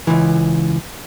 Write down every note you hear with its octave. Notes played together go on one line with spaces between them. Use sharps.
C#2 E3